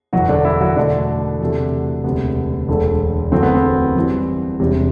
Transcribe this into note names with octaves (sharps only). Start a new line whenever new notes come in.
F#1 E2 B2 F#3 F#4
D3 D4
E3 E4
F#3 F#4
E2 B2 D3 A3 D4
E2 C3 F#3 A3
E1 D2 C3 B3
E1 D2 D3 A3
F#1 E2 D3 F#3 A3 C4
B3
C4
F#2 E3 G3
E1 E2 C3 G3